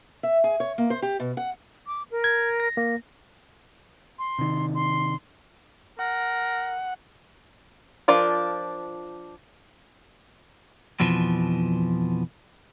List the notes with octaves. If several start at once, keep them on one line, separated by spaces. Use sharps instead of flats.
E5
G#4
C#5
A#3
C5
G4
B2
F#5
D6
A#4
G#6
A#6
A#3 A#6
C6
C3 D#3
C6
A#4 F#5
F3 D4 F4 A#4 D5
F2 B2 E3 F3